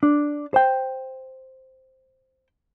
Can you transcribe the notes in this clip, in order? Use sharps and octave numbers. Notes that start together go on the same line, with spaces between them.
D4
C5 G5